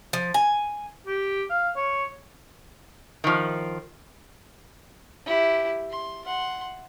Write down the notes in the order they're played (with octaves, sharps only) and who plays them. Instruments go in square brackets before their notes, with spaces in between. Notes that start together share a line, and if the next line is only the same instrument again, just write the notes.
[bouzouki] F3
G#5
[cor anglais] G4
F5
C#5
[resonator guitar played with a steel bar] D#3 F3
[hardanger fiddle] E4 G4
C6
F#5 C6